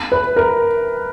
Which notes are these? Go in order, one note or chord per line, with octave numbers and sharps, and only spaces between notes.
B4
A#4